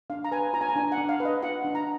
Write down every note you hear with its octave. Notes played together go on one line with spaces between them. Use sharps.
D4 F5
A#5
B4 G#5
F4 A#5
G#5
A#5
D4 G#5
F#5
D4
F5
B4
D#5
F4 F#5
D4
A#5